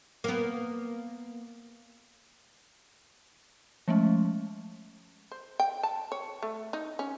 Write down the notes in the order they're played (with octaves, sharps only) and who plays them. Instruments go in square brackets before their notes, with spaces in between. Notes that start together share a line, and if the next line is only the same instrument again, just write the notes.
[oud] A#3 B3
[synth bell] F3 G#3 A3 C#4
[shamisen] C5
G5
A5
C#5
A3
D#4
C#4